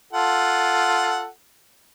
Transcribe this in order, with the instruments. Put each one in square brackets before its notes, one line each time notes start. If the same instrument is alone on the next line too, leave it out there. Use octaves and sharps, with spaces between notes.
[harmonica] F4 A4 F#5